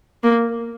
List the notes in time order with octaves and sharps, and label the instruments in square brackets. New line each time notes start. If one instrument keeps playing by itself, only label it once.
[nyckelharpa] A#3